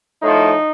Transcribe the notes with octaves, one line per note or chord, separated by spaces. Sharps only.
A2 F3 D#4